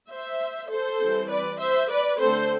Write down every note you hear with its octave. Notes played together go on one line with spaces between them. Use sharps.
C5 E5
A4 C5
E3 G3 C4
B4 D5
C5 E5
B4 D5
D3 A3 C4 A4 C5